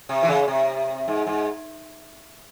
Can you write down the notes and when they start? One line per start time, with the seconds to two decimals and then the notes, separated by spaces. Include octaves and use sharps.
0.09 C3
0.23 E3
0.28 C#3
0.48 C3
1.08 G#2
1.27 G#2